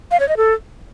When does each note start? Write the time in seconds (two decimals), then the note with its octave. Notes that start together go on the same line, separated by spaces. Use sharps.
0.11 F5
0.20 C#5
0.28 D#5
0.37 A4